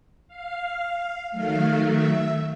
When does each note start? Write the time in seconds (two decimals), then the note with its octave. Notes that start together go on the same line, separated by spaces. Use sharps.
0.28 F5
1.31 D#3 F#3 A3 F5
1.83 E5